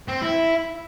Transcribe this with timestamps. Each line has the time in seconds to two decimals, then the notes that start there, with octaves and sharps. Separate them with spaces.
0.08 C4
0.22 E4